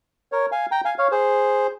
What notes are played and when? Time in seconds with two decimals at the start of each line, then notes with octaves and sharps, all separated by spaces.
0.32 A#4 C#5
0.52 F5 G#5
0.71 G5 A#5
0.85 F5 G#5
0.98 C#5 F5
1.11 G#4 C5